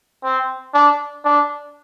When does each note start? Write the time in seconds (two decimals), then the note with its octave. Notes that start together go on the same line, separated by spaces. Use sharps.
0.24 C4
0.74 D4
1.24 D4